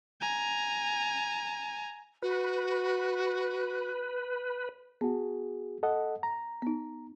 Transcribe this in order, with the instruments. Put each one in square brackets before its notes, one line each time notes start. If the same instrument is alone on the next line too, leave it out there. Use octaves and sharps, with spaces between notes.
[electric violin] G#5 A#5
[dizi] F#4 [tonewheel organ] B4
[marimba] B3 [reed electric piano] F#4 G#4
[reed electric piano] A4 D#5 F#5
A#5
[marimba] B3 D#4